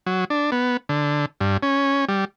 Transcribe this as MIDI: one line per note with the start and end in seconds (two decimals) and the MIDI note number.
0.06 0.25 54
0.30 0.50 62
0.52 0.77 59
0.89 1.25 50
1.41 1.57 43
1.63 2.05 61
2.08 2.25 55